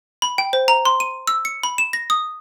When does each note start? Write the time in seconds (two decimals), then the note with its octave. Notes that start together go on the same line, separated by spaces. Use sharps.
0.22 B5
0.38 G5
0.53 C5
0.68 A#5
0.85 C6
1.00 D#7
1.27 E6
1.45 C#7
1.63 B5
1.78 E7
1.93 A#6
2.10 D#6